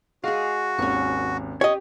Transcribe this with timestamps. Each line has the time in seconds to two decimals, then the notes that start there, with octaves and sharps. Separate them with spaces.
0.24 G#3 F#4 G#4 F5
0.78 G#1 D#2 C#4 C#6
1.61 G4 C#5 D#5